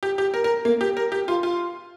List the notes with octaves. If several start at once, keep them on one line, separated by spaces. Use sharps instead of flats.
G4
G4
A#4
A#4
A#3
G4
A#4
G4
F4
F4